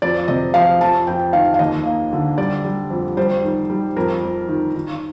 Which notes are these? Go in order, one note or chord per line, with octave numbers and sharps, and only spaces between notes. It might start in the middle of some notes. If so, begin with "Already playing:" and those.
F2 D5
C3 D#5
F3 F5
F2 A5
F2 G5
D#3 F5
F5
D#2 D#5
A#3
D3
G3 D5
G3
F2
G3 C5
D#3
G3
F2 A#4
F2
D#3
D#3